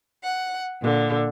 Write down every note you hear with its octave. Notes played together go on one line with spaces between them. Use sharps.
F#5
A#2 D3